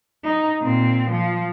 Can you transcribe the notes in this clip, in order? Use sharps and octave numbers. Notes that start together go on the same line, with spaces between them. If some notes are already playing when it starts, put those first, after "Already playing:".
D#4
A#2 C4
F3